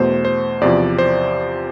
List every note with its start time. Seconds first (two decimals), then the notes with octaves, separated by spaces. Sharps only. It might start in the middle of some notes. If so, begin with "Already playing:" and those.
Already playing: E2 B2 A3 C5
0.25 C5
0.61 E2 C3 F3 D5
0.99 C5